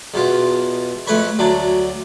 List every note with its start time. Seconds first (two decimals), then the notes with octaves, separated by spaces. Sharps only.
0.14 E2 B2 F4
1.07 F2 A3 B4 C#5 B5 C#6
1.39 D2 F#3 D4